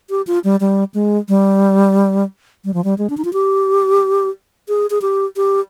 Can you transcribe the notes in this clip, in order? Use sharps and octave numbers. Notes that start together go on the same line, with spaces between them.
G4
F4
G3
G3
G#3
G3
G3
F3
G3
G#3
D4
D#4
F4
G4
G#4
G#4
G4
G4